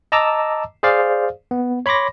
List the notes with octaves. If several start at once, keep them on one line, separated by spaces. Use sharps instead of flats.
D#5 A5 A#5 D6 E6
G#4 C5 D5 F5
B3
C#5 B5 C6 D6 A#6